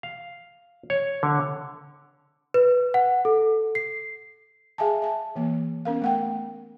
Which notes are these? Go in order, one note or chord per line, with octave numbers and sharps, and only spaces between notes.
F5
C#5
D3
B4
F#5
A4
C7
G#4 E5 F5 G#5 A5
E5 A5
E3 A#3
B3 C#4 A#4 F5
A3 F#5 G5